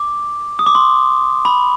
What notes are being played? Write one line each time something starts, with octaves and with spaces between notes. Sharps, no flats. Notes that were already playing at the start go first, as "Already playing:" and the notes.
Already playing: D6
D#6
D6
C6
B5